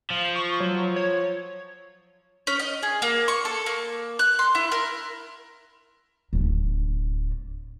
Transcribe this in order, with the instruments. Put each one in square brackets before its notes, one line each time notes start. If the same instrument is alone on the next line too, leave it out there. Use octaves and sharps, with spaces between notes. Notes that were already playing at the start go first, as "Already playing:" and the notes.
[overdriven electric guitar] F3
[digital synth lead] C#6
F#3
C#5
[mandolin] C#4
D#5
G#4
A#3
C#6
A4
A#3
F#6
C6
E4
A#4
[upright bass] D1 D4